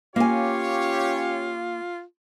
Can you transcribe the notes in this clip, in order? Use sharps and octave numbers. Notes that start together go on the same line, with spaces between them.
A#3 C#4 F4 G4 C#5 G#5